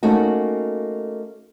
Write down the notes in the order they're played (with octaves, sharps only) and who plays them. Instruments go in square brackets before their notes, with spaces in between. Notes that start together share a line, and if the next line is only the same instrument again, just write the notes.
[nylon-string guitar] A3 A#3 C#4 D#4 F#4